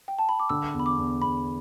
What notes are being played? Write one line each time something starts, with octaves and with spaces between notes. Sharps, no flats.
G5
A5
B5
D6
D3 E6
E2
B5
D6
E2
E2 B5